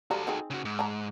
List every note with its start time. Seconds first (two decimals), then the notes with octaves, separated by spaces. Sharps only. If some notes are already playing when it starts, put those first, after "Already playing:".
0.11 F3 G3 F#4 A4 A#5
0.27 C4 D#4 G#4
0.50 C#3 F#4
0.65 G#2
0.79 A5 A#5